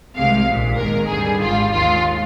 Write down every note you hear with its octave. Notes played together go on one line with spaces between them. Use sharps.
C2 C3 D#3 G#3 F5
A#1 A#2 G#3
G#1 G#2 D#3 G#3 A#4
D#2 D3 G3 G#4
G#1 G#2 G3 F4
D#2 D#3 G#3 F4